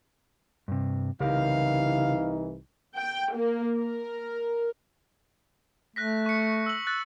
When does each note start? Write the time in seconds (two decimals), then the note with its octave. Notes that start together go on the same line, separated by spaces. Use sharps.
0.68 G2 C3
1.20 C2 C#3 E3 D#4 G4 A#4 F5
2.96 G5
3.34 A#3
3.78 A#4
5.96 A3 F#6 A#6 B6
6.26 C#6 C#7
6.66 E6 F#7
6.87 F#6 A6